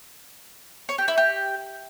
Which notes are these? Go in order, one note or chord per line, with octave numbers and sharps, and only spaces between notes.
C#5
G4
E4
G4